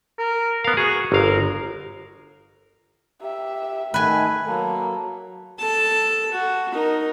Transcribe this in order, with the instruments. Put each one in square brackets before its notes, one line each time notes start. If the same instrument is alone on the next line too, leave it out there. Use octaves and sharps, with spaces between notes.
[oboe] A#4
[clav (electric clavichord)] B3 F5 [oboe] A#4
[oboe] F#4 [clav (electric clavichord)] G#4
[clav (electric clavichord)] G1 F5 [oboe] A#4
[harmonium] G4 [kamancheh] E5
[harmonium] D#3 A3 [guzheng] B4 G#5
[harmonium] F#3 A4 [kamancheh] A#3
[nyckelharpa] A4 A5
F#4
D#4 A#4